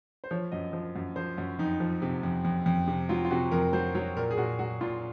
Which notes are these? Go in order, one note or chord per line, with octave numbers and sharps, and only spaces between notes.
C5
F3 C#5
F#2 D#5
F3
F#2
F3 C5
F#2 C#4
F2 D#4
F3
C3
F2
F2
F2
C3
F#3 F4
F4
C3 F#4
F2 A#4
F#3 C5
F#3 C#5
A#2 A#4
G#4
A#2 F#4
F#3 F#4
A#2 F4